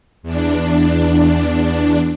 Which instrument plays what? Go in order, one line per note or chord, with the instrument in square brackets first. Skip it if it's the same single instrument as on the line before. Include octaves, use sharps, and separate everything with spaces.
[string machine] E2 D4